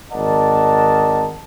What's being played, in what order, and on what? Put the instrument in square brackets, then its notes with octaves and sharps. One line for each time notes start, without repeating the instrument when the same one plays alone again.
[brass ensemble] G#1 A#4 D5 D#5 F#5 A5